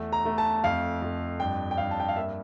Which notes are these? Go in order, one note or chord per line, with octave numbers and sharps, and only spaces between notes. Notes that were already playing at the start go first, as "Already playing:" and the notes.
Already playing: E2 A3
A#5
A3
A5
F2 F5
F2
G2 G5
G5
G2 F5
A5
G5
F5
A#3 E5